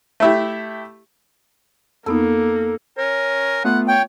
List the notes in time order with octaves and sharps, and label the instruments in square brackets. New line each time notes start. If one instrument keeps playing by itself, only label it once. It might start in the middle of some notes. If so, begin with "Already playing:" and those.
[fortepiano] A3 E4 G4
[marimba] F2 B3 D#4 [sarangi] A#3 [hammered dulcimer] A4
[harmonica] C#4 C#5 G#5 [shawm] A#4
[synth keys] A3 B3 F4 [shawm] F#5
[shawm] C#5 [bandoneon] G5